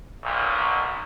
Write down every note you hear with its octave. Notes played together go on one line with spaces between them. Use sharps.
B1 A#2